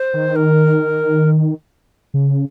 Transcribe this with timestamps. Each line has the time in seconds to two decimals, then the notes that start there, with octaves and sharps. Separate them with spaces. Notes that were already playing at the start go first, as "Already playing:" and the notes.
Already playing: C5
0.14 D#3
0.36 A#4
2.14 C#3